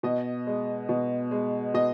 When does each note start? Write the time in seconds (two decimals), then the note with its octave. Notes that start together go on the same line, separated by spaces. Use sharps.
0.03 B2 D#5
0.47 G#3
0.89 B2
1.31 G#3
1.74 B2 D#5